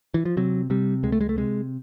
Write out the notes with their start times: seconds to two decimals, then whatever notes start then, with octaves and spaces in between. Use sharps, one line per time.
0.14 E3
0.25 F3
0.37 C3 F#3
0.70 C3 G3
1.03 C#2 G#3
1.12 A3
1.21 G#3
1.29 A3
1.36 C3 G#3